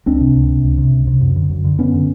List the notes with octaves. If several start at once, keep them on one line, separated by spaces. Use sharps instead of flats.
C#2 C4 D4
C3
C#2
C3
C#2
C3
C#2
C3
F#2
D3
F#2
D3
F#2 B3 C#4
D3